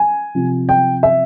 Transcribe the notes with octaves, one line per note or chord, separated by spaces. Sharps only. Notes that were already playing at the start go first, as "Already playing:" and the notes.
Already playing: G#5
C3 F3
G5
E5